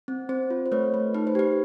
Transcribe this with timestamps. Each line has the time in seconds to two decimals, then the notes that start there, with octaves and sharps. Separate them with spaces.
0.08 C4
0.29 C4 C5
0.50 F4
0.66 C5
0.72 A3 B4 C#5
0.94 A3
1.14 D#4 B4
1.27 C5
1.35 G4 B4